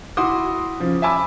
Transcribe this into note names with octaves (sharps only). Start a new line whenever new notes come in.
E4 F#4 C6 D6 D#6
C#3 F3
E5 G#5 A5 B5 D6 E6